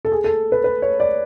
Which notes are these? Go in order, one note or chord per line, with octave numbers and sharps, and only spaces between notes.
A4
G#4
A4
B4
B4
C#5
D5